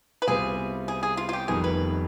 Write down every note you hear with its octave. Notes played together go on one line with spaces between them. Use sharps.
B4
C2 C3 G3 B3 F4 G#4
G#4
G#4
F4
F4
G4
F1 F2 D#3 G3 B3 G#4
B4